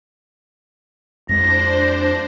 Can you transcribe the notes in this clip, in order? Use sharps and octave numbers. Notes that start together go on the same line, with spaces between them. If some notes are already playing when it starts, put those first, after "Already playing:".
F2 G#3 D4 C5 A#6